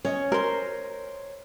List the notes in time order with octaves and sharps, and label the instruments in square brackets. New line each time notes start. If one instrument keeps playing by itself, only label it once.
[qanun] C#4 [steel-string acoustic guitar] C#5 D#5
[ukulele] A#4 [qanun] C5 C6